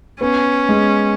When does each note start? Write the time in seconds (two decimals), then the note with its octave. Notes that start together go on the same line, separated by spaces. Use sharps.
0.21 B3 C#4
0.69 G#3